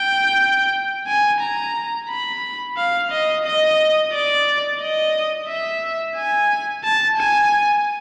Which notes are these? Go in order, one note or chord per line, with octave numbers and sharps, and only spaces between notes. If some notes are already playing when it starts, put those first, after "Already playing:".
Already playing: G5
G#5
A#5
B5
F5
D#5
D#5
D5
D#5
E5
G#5
A5
G#5